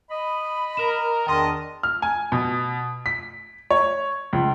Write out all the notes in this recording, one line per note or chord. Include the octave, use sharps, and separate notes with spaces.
D#5 B5
A#4 E7
E2 D#3 D4 A#4 D#5 G5 A5 C6
F6
G#5
B2
B6
C#5
C#2